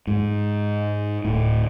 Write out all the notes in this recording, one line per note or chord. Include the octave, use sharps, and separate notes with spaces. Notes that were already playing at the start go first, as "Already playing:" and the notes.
G#2
D1 A2